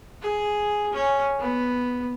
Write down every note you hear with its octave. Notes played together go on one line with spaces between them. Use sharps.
G#4
C#4
B3